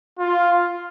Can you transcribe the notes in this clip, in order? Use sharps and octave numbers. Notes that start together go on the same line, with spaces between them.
F4